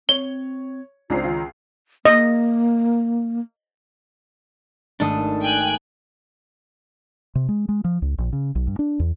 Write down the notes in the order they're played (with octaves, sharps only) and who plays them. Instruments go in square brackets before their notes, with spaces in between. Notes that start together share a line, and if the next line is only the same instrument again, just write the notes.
[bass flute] C4 [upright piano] C#5 [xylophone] G7
[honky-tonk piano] C#2 A#5 C7 [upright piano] C4 D4 [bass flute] F4
[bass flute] D#3 [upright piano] F4
[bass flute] A#3 [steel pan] D#5
[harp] G#1 A3 D#6 [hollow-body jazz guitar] D4 A4
[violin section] G5 G#5 F#6
[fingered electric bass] C3
G#3
G#3
F3
C#2
A#1
C#3
B1
G2
D4
E2